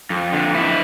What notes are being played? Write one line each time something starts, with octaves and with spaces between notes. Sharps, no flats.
F2
D3
E4